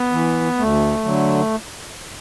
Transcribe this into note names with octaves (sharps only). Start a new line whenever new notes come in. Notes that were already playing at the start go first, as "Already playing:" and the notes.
Already playing: B3
E3
D2 A3
D3 F#3